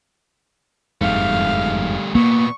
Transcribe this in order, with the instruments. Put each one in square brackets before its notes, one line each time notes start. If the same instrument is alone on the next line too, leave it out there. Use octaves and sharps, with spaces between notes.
[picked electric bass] F#1 F2 G#2 [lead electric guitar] G3 A3 [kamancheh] F5
[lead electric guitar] A#2 B3 [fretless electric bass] A#3 [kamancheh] C#6